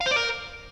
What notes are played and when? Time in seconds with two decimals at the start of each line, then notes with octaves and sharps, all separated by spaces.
0.01 F5
0.06 C5
0.11 D5
0.16 A#4